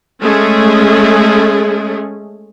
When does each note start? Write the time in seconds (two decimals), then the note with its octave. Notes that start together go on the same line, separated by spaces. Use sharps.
0.20 G#3 A3 C#4 G#4